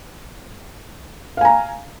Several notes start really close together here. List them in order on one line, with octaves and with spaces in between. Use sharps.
F5 G#5 A#5